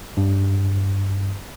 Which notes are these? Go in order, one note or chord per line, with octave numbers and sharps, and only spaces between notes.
G2